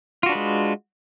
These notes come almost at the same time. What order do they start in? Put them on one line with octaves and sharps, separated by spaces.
F4 F#4 D4 B4 G#3